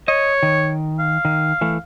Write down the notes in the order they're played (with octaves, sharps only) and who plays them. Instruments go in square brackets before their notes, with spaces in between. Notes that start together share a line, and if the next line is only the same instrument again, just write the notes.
[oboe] C#5 [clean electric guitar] D#5
[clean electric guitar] D#3
[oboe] F5
[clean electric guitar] D#3
E3 A3